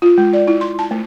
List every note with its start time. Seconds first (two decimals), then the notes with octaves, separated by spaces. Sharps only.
0.02 F4
0.18 G#3
0.33 D5
0.47 E4
0.61 C6
0.79 A5
0.91 A3